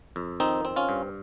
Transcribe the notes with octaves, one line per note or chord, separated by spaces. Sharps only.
F2
D#3 C4 D#4
C4
C#4 F4
G2